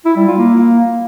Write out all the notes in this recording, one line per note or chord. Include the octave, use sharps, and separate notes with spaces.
E4
G3
F4
A#3